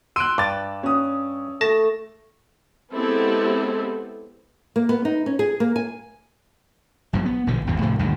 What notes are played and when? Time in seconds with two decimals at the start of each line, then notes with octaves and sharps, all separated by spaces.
0.16 C6 E6 F#6 D7 D#7
0.38 G2 D6 A6
0.83 C#4 D#6
1.61 A3 A5 A#6
2.94 G#3 B3 C4 E4 G4 A4
4.76 A#3
4.89 B3
5.05 D#4
5.26 C#4
5.39 G#4
5.60 A#3
5.76 G#5
7.13 B1 G2 B2 F3
7.25 B3
7.47 A#1 B2 D3 E3
7.67 G#1 E2 G2 B2
7.82 C2 A2 C3 F3
7.99 D2 G2 A#2 D#3